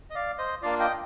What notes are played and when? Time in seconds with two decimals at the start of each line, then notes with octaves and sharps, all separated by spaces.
0.10 D#5
0.15 D5 F5
0.38 C5 D#5
0.62 A#3 D4 F4 D5 F5
0.80 D#5 G5